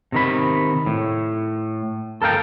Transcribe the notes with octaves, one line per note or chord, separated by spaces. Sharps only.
C3 D#3 B5
A2
A4 A#4 F5 G5